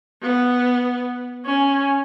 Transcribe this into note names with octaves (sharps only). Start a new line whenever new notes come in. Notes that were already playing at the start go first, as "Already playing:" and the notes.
B3
C#4